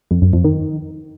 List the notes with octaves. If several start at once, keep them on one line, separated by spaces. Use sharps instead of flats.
F2
F#2
F2
D#3